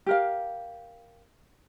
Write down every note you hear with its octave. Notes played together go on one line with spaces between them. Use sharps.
G4 A#4 F5